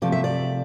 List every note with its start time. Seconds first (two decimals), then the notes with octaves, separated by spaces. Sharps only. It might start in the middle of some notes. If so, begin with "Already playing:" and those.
0.02 C3 F3 A3 D5
0.12 E5
0.24 D5